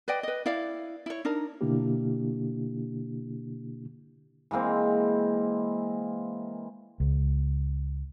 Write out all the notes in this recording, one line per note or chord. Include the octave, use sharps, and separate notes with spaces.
B4 D5 D#5 G5
B4 D#5
E4 D5 F5
E4 C#5
D4 D#4 A#4
B2 D3 A#3 D4 E4 G4
E3 G#3 A#3 C4
C#2